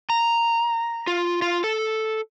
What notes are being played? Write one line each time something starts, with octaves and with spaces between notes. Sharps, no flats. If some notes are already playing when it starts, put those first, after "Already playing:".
A#5
F4
F4
A4